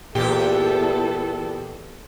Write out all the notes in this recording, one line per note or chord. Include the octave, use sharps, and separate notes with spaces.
E2 A#2 B3 E4 G4 A4